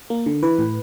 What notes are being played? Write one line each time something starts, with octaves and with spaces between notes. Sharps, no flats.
A#3
D3
E3 B4
A2